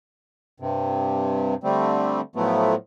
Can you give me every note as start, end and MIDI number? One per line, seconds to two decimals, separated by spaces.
0.60 1.55 43
0.60 1.55 48
1.64 2.21 50
1.64 2.21 55
1.64 2.21 57
1.64 2.21 60
2.36 2.75 45
2.36 2.75 53
2.36 2.75 54
2.36 2.75 57
2.36 2.75 59